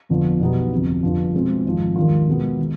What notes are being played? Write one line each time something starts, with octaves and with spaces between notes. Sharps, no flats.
G1 F2 D3 F3 B3
B1 B2 G3 B3 D#4
G1 F2 C3
G1 G2 F3
B2 G#3 C4 F4
G#1 G#2 F3
D#2 D#3 G#3 D4 F4
B2 G#3 B3
D#3